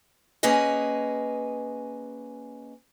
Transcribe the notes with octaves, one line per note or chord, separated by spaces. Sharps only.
A#3 C#4 G#4 B4 D#5